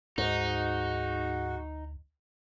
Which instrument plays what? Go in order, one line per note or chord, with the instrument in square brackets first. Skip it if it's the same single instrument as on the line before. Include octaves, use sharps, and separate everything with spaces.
[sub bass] D2 [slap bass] G#2 [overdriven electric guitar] D#4 [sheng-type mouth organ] F#4